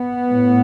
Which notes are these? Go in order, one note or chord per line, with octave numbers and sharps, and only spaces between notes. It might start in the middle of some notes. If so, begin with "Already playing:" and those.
Already playing: B3
A2